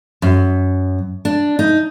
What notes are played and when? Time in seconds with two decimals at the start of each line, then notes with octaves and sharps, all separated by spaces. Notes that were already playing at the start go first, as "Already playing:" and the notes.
0.22 F#2
1.25 D4
1.59 D#4